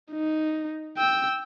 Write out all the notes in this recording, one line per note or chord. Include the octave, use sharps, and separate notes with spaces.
D#4
G5 E6